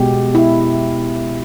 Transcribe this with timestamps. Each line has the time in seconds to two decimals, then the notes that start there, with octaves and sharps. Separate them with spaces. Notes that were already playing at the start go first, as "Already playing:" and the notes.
Already playing: B2 G#3 G4
0.35 E4